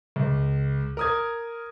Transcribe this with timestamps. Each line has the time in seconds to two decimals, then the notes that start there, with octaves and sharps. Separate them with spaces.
0.16 C#2
0.97 A#4 D#6 G#6